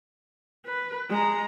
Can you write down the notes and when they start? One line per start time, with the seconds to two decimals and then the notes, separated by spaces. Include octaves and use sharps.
0.65 B4
1.10 G#3 A#5